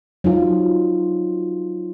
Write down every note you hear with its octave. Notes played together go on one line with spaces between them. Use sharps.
F#3 D#4 F4